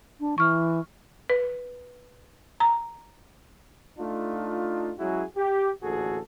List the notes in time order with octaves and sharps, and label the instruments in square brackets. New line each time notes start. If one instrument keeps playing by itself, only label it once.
[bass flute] D4
[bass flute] E3 [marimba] C#6 F6
[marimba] B4
A#5
[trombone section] A3 D4 D#4 F4
F#3 G#3 C#4 E4 F#4 G#4
G4
A1 D2 A#2 F#4 G#4 A4